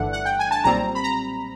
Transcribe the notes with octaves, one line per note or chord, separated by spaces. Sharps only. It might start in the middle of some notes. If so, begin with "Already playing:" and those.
Already playing: G1 G2 E3 A3 D4 F#5
F#5
G5
G#5
A5
B1 A#2 G3 C4 A#5
B5
A#5